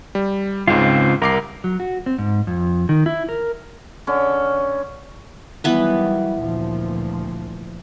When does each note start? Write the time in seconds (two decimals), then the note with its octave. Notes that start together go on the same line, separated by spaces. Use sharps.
0.15 G3
0.68 C#2 G#2 C#3 C4 F4
1.22 C2 A#4 D6 C7
1.64 F#3
1.80 F#4
2.06 C4
2.18 G#2
2.47 F2
2.89 D#3
3.06 E4
3.29 A#4
4.07 D3 C#4
5.64 D#3 E3 F#3 G3 B3 B4
6.37 D2 A#2 F3